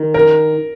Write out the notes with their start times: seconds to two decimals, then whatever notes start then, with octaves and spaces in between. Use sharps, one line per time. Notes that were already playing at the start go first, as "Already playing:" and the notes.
Already playing: D#3
0.14 A#4